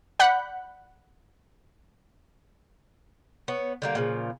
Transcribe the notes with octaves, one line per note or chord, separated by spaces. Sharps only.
D5 F#5 B5 F#6 G6
B3 C#5
D3 G3 A#3
A#2 C#3 F3